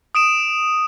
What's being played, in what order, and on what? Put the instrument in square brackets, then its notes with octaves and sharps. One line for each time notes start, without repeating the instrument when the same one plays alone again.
[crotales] D#6 D7 E7